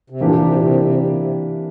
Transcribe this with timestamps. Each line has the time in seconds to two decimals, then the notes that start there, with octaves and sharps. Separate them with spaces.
0.10 C3
0.20 A#2 E3 A#3 D4 G4
0.40 C3
0.54 A#2
0.61 C3
0.81 C3